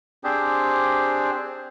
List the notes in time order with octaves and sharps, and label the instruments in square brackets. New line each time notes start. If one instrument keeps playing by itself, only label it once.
[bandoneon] C4 D4 G4 G#4 C5